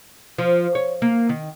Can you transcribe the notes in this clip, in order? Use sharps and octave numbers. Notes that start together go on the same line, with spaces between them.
F3
C#5
A#3
D#3